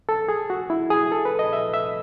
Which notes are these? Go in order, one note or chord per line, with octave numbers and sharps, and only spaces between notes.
A4
G#4
F#4
E4
G#4
A4
B4
D#5
E5
E5